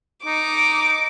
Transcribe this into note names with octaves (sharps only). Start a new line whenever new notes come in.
D#4 D6